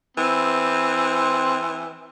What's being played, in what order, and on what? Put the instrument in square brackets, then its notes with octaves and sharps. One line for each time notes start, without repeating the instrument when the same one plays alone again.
[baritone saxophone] E3 [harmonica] C4